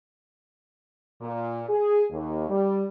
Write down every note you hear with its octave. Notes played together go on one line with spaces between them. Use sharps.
A#2
G#4
D#2
G3